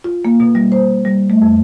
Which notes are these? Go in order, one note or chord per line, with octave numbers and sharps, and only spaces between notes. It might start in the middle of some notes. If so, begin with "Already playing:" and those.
F4
A#3
B2
G3
C5
G3
A3
F2